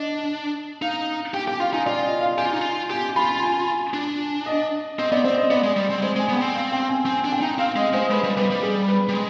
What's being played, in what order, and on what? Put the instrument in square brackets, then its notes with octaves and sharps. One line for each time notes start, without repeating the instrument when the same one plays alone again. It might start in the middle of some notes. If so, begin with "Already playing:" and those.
Already playing: [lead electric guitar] D4 [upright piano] D#5
[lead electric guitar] D#4 [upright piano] F5
[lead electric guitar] G4 [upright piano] G5
[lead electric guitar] G4 [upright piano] G5
[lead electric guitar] F4 [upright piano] F5
[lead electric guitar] D#4 [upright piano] G#5
[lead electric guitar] F4 [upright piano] D5
[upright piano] D#5
F5
[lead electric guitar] G4 [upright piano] G#5
[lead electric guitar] F4
D#4
F4
[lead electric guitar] G4 [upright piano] G#5
[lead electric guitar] F4 [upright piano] B5
[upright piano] G#5
[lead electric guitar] D4
[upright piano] D#5
[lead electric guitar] C4 [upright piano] D#5
[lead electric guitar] B3 [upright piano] D5
[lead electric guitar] C4 [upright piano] C5
[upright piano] D#5
[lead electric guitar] B3 [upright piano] D5
[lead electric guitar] G#3
G3
C4
[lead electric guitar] G#3 [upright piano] C5
[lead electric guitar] G#3 [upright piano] G#5
[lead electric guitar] B3
[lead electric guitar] C4 [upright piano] G5
[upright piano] F5
G5
G#5
[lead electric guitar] C4 [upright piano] G#5
[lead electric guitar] D4
[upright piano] G5
[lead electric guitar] D#4
[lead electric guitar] C4 [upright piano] F5
[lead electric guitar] G#3 [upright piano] D#5
[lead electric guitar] G#3 [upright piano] C5
[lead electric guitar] G#3 [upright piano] B4
[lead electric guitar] G3
[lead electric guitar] G3 [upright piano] B4
[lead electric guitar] G3
[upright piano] G#4
B4
[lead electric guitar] G3
G#3